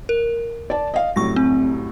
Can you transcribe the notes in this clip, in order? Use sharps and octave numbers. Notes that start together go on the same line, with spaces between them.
A#4
D5 A5
D#5 F5
C2 F#2 A2 C#6 A#6
C4